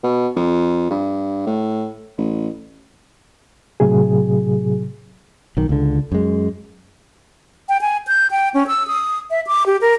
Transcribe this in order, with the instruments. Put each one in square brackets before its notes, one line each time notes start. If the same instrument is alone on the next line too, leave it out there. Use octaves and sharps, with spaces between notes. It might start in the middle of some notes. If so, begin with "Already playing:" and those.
[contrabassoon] B2
F2
G2
A2
A1
[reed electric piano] A2 C3 F#3 G#4
[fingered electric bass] B1 D#3
C#2 D3
F#2 G#3
[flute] G5
G#5
G6
G5
C#4
E6
D#6
E5
D6
G4
A#4